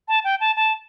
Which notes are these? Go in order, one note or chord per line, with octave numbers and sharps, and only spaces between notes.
A5
G5
A5
A5